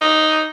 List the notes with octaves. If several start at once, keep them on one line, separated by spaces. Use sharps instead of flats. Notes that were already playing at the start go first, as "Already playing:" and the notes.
D#4